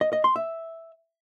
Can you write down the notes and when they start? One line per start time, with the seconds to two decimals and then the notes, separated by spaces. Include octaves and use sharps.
0.01 D#5
0.13 D#5
0.24 C6
0.36 E5